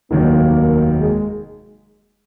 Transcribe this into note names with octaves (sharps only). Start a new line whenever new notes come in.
F1 D#2 D#3 F#3 A#3
G#3